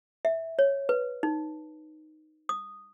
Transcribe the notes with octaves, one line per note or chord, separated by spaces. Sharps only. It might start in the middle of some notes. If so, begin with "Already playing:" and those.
E5
C#5
B4
D#4
D#6